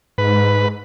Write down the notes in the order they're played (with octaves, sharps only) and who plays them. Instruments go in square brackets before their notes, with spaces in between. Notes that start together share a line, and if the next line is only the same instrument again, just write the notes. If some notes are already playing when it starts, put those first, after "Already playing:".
[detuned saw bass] G#2 [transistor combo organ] B4